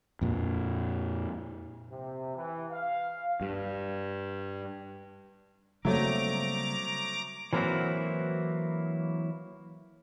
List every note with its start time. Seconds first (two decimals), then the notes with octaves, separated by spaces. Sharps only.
0.21 F2 A#2
1.90 C3
2.36 E3
2.71 F5
3.41 G2
5.85 C#3 F#3 G3 A3 A#3 C4 A#5 D6
7.53 E3 F#3 A#3 C4 E4 F#4